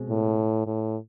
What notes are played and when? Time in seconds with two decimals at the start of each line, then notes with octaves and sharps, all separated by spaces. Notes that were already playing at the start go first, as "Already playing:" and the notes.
Already playing: B2 G#3 C4
0.09 A2
0.66 A2